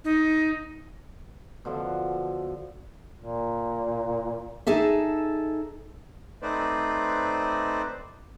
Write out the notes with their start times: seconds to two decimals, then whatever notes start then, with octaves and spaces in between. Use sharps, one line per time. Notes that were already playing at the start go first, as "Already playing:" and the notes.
0.04 D#4
1.65 B2 D3 F3
3.18 A#2
4.67 D#4 G#4 A4 E5
6.42 A3 C4 D#4 B4 C5 D5